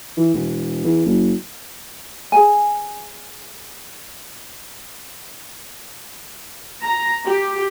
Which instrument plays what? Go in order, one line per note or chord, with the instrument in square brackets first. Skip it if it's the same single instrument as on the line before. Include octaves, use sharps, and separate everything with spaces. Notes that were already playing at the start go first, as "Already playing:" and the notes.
[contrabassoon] E3
E1
E2
F#1
[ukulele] G#4 G#5
[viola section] A#5
G4